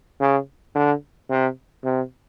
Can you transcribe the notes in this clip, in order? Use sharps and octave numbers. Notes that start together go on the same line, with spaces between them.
C#3
D3
C3
C3